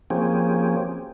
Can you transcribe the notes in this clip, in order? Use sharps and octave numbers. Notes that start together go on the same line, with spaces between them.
F3 A#3 C4 C#4 G4 G#4